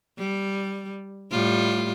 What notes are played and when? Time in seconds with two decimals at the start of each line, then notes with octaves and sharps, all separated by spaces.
0.18 G3
1.31 A2 G3 F4